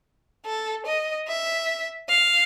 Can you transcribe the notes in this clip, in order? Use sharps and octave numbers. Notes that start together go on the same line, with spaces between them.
A4
D#5
E5
F5